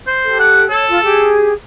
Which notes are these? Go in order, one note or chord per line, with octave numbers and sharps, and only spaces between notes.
C5
G4 A4
F#5
A4 C#5
F4
G4 G#4